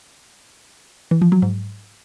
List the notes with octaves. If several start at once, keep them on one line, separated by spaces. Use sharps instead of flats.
E3
F3
F#3
G#2